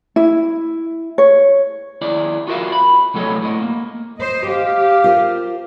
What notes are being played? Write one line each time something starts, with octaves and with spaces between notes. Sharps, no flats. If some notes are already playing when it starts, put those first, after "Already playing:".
E4
C#5
D#2 E4 D5
F4 F#4 A#4 D5 E5 F5
B5
C2 A2 F#3 A4 C#5 D#5
A2 D#5
A#3
C5 D#5
G4 F5
F4 A#4 C5